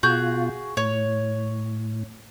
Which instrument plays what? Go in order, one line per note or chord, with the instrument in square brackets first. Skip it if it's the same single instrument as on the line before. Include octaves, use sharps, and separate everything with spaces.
[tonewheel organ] B2 F4 [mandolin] F#4 G#4 G6
[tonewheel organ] A2 [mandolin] C#5